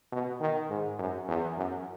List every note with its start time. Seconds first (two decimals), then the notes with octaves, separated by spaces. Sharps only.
0.12 B2
0.40 D#3
0.70 G#2
0.99 F#2
1.28 E2
1.57 F#2